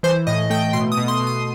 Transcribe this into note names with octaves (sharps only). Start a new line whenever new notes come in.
E3 C5
A2 D#5
A3 G5
B2 C6
D#6
B2
C6
B2
D#6